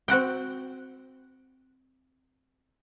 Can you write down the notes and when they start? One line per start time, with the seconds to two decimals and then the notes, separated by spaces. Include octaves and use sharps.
0.08 C4 F#4 F#5 G5